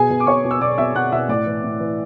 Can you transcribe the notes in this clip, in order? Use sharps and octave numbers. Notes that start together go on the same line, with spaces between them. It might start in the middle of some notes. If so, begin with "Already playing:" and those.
Already playing: B2 G#4 G#5
B2
D6
B2 C#5 C#6
B2
E6
B2 D5 D6
B2 E5 E6
B2 F#5 F#6
B2 E5 E6
A2 D5 D6
E3
A2
E3